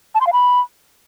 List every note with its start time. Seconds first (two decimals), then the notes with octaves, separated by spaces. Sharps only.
0.15 A5
0.21 C6
0.27 F5
0.33 B5